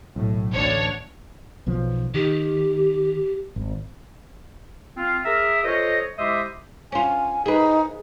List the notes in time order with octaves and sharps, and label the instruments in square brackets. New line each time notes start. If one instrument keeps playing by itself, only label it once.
[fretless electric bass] B1 [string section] A2
[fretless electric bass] A1 [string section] D2 D4 C#5
[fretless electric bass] B1 B2 F3
[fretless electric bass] D#3 [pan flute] G4
[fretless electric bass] G#1
[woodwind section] C4 F4
G#4 A#4 E5
F4 A4 C5 C#5 D#5
G#3 E4 G4 C5 D#5 E5
[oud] C#4 F4 [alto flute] G#5
[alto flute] D#4 [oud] G#4 B4